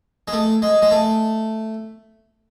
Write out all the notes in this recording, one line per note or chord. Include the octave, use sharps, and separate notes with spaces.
G#3
A3
G#3
G#3
A3